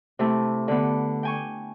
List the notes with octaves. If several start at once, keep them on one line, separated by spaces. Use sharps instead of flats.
C3 A3 E4
D3 B3
G5 G#5 C#6